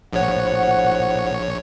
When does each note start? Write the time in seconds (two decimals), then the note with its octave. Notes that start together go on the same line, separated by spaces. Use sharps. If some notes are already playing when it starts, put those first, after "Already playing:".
0.13 A#1 A2 F3 C#5 F#5